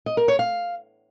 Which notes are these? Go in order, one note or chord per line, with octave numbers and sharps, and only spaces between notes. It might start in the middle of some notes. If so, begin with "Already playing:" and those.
D#5
A#4
C#5
F5